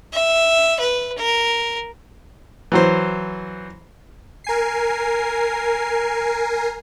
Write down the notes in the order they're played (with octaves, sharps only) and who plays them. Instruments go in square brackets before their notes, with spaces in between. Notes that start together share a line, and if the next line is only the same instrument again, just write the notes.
[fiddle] E5
B4
A#4
[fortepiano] E3 F#3 C5
[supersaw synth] A#4 G#5 C7